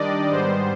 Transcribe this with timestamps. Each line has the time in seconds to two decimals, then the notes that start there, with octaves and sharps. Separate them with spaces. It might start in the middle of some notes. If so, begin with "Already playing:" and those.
Already playing: D#3 G3 D4 D5 D#5
0.30 G#2 G3 B3 C5